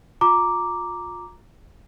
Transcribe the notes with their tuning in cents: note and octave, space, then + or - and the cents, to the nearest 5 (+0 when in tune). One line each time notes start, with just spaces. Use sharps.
F4 +25 A#5 +0 D6 +0